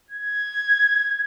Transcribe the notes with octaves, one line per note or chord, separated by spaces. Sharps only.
G#6